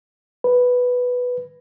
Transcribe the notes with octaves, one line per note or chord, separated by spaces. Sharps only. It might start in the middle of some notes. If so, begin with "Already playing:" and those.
B4